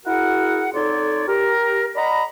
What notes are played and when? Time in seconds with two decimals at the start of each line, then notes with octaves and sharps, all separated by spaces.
0.06 E4 F#4 G#4 A#4 F#5
0.74 F2 D#4 A4 C#5 D5 C6
1.27 G4 A#4
1.95 D5 D#5 F#5 A#5 B5